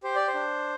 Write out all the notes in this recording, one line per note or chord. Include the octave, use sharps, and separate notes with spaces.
G4 C5
D5
C5
D4